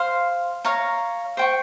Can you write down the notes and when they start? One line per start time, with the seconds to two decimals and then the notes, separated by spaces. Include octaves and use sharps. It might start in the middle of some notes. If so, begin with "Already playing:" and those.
Already playing: C5 F5 C6
0.65 C#5 F5 A#5
1.37 C5 G5 C#6